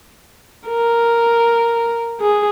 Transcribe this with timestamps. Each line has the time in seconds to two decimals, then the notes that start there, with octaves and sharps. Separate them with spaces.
0.69 A#4
2.21 G#4